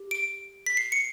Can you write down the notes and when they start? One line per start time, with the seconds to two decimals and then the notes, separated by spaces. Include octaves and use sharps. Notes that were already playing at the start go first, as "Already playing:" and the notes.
Already playing: G4
0.11 D7
0.66 B6
0.77 C7
0.92 C#7